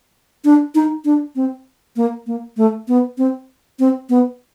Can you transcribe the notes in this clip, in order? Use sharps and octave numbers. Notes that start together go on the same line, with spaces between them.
D4
D#4
D4
C4
A#3
A#3
A3
B3
C4
C4
B3